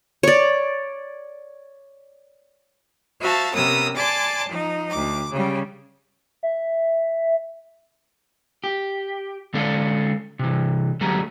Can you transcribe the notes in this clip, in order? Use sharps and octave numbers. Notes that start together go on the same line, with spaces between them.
C#5 D5
F#4 C5 E5 F5 A5
C3 B3 C#4 A#4 D#6 E6
D5 G#5 A5 C6 D6 A6
F3 D#4
D2 D6
C#3 G3
E5
G4
D3 G#3 C#4 A4 D5 F5
C3 E3
D2 F#3 A3 G4 G#4 A#5